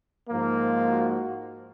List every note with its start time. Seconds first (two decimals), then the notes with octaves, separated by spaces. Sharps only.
0.29 G#2 F3 A#3
0.89 F#4